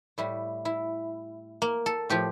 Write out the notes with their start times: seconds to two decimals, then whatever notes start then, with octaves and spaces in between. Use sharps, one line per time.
0.18 A2 G3 E4
0.65 E4
1.62 A#3
1.86 A4
2.09 A2 F3 G4